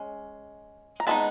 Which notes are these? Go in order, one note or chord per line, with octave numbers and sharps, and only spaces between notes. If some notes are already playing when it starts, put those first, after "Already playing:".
Already playing: G#3 C#4
A#5
G#3 B3 D#4 A5 B5